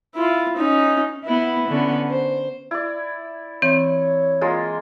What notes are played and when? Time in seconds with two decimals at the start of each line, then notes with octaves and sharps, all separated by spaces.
0.15 E4 F4
0.56 C#4 D#4
1.24 B3 E4
1.68 D3 B3 C#4
2.09 C5
2.71 E4 D5
3.62 E3 C4 C#5
4.41 G#3 A#3 F4